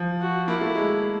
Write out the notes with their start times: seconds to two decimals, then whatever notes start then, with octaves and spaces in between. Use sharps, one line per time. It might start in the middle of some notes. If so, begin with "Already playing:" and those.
Already playing: F3
0.20 F#4
0.48 A#3 E4
0.61 A3
0.76 G#3